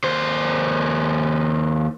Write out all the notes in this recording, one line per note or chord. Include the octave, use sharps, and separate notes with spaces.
D#2 C5